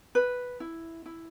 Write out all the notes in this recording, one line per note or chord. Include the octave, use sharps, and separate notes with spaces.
B4
E4
E4